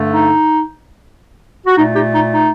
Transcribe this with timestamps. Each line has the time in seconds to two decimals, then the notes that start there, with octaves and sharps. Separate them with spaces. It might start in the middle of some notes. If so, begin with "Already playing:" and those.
Already playing: G2 D3 A3
0.10 D#4
1.66 F#4
1.77 A#2 A3 D#4
1.95 D#4 G4
2.14 D#4
2.33 D#4